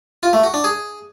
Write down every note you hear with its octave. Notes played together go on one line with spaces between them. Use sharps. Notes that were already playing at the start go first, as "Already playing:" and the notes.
F4
A3
F#4
D4
G#4